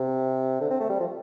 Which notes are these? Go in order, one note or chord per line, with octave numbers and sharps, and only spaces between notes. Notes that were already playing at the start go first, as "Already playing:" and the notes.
Already playing: C3
D3
C4
A3
G3
F3